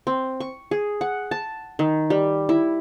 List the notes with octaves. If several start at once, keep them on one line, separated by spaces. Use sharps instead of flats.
C4
C#6
G#4
F#5
A5
D#3
G3
E4